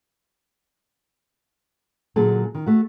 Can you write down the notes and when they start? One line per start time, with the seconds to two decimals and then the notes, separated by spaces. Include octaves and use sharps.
2.16 A#2 D3 F#3 G#4 A4
2.55 D#3
2.66 A3 F#4